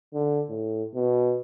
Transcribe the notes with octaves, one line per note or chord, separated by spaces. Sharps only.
D3
A2
B2